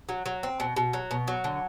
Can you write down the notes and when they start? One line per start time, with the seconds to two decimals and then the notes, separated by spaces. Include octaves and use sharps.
0.09 F#3
0.26 F#3
0.43 C4
0.60 B2
0.76 B2
0.93 F#3
1.11 B2
1.28 F#3
1.44 D3